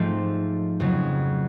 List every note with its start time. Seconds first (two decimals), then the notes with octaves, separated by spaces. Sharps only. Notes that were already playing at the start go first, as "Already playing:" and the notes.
Already playing: G#2 F3 A3 C4
0.80 F2 C#3 F#3